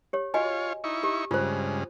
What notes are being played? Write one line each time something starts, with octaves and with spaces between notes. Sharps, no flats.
G4 C#5
F4 F#4 C#5 D#5 G#5
D#4 E4 C#6
G4
G2 C#3 G#3 F4 C5